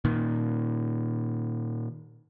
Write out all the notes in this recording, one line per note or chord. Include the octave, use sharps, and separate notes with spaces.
A#2 D#3